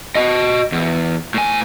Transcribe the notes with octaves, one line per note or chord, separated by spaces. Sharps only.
F#4 D#5
E2
A2 G#5